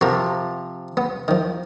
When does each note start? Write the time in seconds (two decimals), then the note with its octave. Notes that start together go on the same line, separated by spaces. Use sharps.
0.01 C3 F3 F#4 A#4
0.97 B3
1.28 D#3 F3